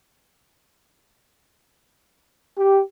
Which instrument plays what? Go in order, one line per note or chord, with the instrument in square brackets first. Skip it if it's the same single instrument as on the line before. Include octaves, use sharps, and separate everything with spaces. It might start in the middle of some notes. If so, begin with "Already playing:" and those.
[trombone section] G4